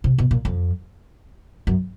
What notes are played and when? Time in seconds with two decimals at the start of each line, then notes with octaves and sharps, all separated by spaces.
0.04 C3
0.18 B2
0.31 A#2
0.45 F2
1.67 F#2